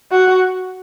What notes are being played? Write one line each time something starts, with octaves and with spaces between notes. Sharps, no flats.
F#4